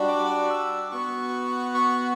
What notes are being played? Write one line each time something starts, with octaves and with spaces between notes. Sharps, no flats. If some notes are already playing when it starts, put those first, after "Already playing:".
Already playing: G3 D4 F#4
D6
E6
D6
B3 F#4 C#6
C#6